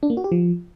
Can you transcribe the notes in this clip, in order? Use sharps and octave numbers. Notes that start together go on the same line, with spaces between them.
D4
A#3
F#4
G4
F3